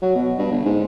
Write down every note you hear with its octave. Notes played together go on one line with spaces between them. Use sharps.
F#3
B2
G2
G1
G#2